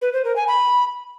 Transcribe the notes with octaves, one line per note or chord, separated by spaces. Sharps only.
B4
C5
A#4
G#5
B5